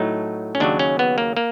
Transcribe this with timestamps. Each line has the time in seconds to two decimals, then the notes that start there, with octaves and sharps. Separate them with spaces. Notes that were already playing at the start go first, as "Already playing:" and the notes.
Already playing: A2 F#3 A3 D#4
0.55 C#4
0.60 D#2 C#3 F#3 D4
0.79 C#4
0.99 B3
1.18 A#3
1.37 A#3